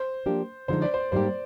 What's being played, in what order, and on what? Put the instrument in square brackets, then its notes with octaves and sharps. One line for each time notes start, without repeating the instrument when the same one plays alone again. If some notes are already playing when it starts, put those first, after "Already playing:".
Already playing: [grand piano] C5
[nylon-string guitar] F3 A#3 D4 G4
[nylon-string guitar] D3 F3 G#3 D#4 [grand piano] C5
[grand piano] D5
C5
[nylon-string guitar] G#2 G3 A#3 D#4 G4 [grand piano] C5